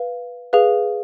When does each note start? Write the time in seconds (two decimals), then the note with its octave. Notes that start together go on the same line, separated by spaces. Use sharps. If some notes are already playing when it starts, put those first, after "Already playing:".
Already playing: B4 F5
0.53 G#4 B4 F5